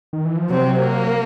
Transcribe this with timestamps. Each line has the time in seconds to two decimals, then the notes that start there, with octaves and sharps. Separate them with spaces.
0.13 D#3
0.25 E3
0.37 F3
0.50 C3 F#3 C4
0.80 A#3